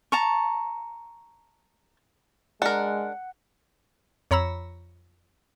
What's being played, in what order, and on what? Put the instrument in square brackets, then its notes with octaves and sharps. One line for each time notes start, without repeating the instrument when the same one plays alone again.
[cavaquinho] A5 A#5 C#6
[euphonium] G#3 [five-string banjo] D4 A#4 [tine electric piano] F#5
[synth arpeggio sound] F2 C#5 A#5 B5 E6